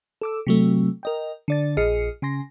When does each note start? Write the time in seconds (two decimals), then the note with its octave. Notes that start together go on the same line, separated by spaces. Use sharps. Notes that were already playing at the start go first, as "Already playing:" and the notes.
0.22 A4 D6 E6
0.47 C3 F#3 A3
1.03 A#4 D#5 G5
1.48 D3 D5 A6
1.77 A#1 G#4 D#5 F6 C7 C#7
2.22 C#3 G#5 C6 A#6